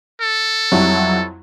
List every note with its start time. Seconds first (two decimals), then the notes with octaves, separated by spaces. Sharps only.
0.22 A4
0.72 F2 F#3 G3 E4